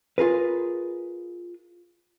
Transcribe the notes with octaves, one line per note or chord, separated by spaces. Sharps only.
F4 G#4 A#4 B4